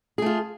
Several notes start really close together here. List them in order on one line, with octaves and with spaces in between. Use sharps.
G#4 A3 F4